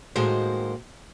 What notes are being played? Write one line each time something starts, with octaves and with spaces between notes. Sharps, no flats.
A2 D#3 G#3 A#3 F#4 C5